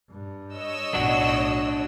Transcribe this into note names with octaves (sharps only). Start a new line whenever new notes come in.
G2
C#5 D#5 E6
B1 A2 D4 F#4